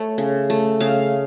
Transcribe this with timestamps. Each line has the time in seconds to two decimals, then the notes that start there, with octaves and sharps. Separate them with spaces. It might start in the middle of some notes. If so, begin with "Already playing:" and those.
Already playing: A3 C#5
0.18 C#3
0.50 A3
0.80 C#3 F5